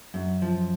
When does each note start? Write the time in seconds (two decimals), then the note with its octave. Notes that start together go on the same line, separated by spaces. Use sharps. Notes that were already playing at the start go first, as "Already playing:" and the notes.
0.14 F#2
0.42 F3